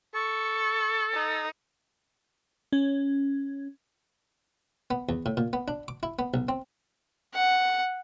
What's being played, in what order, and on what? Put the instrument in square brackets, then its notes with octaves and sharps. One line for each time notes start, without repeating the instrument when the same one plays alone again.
[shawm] A4 [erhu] C#6
[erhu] D#4
[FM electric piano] C#4
[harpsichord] B3
E2
A2
A#2
B3
D4
D6
E4
B3
B1
C4
[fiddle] F#5